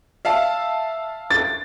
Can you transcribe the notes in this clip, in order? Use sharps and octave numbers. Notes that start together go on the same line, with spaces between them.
E5 F5 A5
A6